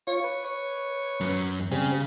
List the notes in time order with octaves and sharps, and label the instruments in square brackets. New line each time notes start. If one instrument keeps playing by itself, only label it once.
[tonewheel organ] F4 [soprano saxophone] C#5
[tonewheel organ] B4
[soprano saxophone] C#5
[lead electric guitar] F#2
[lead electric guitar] C#3 [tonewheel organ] G3 C4 G#4